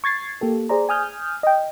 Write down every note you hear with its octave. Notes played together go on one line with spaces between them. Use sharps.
C#6 G#6 A6 C7
A#3 G4 A4
G#4 C5 D5 A#5
G#5 D#6 F6 G6
D#5 G5